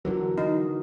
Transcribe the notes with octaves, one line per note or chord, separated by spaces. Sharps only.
D3 E3 F#3 F#4 A#4
D#4